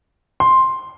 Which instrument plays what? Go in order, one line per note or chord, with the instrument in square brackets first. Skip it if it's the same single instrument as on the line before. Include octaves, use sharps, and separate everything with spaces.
[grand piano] C6